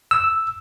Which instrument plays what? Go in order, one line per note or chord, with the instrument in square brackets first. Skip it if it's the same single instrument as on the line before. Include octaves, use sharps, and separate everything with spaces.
[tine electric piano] E6